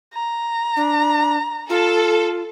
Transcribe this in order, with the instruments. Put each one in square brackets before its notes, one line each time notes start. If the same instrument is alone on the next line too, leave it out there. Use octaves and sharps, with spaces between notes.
[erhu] A#5
[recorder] D4
[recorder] F4 [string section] A4